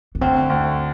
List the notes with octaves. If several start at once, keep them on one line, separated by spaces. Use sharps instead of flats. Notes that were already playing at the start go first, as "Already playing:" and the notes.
B3
D2 C4
D2